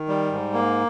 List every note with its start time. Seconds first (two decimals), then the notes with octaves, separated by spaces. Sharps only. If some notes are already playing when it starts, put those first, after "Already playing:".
Already playing: D#3
0.09 G3
0.32 G#2
0.54 A#3